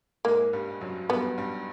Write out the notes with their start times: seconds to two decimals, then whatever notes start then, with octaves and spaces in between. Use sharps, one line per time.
0.25 G#2 G#3 A#3
0.53 G2 G3
0.81 F#2 F#3
1.09 G2 G3 B3
1.38 G2 G3